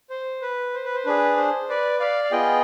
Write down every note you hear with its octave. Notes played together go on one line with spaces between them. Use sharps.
C5
B4
C5
B4
C5
D4 G#4 B4
C5
B4 D5
D5 F5
F5
B3 F4 G#4 D#5 G5